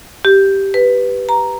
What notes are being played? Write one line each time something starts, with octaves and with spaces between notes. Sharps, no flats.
G4
B4
A#5